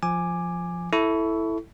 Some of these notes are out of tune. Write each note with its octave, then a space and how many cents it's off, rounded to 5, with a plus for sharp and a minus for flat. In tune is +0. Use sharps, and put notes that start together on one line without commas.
F3 +0 G#5 +0 D6 +10
E4 +0 A4 +0 C#6 +30